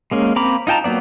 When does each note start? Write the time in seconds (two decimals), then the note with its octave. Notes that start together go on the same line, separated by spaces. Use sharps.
0.11 G#3 A#3 C#4
0.36 A#3 C4 A#5 B5 D6
0.67 D#4 F4 G5 A5 A#5
0.84 F#3 A#3 B3 D5